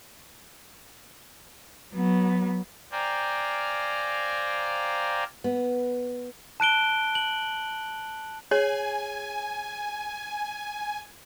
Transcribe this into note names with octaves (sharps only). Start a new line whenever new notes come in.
F#3 B3
C5 D5 F5 G5 G#5 A#5
B3
A5 F#6 D7 G7
F#7
G#4 C#5 G#5